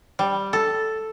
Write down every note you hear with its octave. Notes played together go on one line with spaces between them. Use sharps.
G3
A4